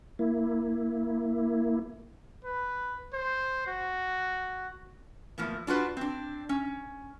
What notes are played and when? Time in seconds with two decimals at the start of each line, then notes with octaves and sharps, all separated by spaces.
0.19 A#3 E4
2.44 B4
3.13 C5
3.67 F#4
5.38 A2 F3 A#3 B3
5.67 D4 F4 F#4 B4
5.97 C4 D4
6.49 C#4